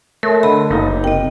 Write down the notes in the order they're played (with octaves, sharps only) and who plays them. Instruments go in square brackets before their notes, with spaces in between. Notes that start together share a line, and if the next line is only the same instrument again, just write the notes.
[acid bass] A3 [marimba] A#4 [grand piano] C#5
[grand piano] D3 [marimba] D#5 B5
[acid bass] F#1 [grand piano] A#3 D#4
[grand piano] C3 [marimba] D#5 G5